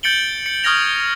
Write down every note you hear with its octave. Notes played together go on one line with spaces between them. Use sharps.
G6 A6 C#7 D7 F#7 G7
C#7
C#6 D#6 F6 G#6 A#6 F7